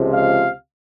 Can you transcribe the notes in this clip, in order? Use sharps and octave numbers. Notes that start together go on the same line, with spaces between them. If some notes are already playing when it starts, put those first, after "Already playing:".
Already playing: C#2 C3 F3 G#3
F5